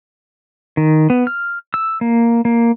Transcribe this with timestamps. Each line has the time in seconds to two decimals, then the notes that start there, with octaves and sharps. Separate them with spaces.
0.77 D#3
1.10 B3
1.27 F6
1.74 E6
2.01 A#3
2.45 A#3